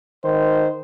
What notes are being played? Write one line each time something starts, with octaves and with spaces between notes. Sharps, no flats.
D#3 C5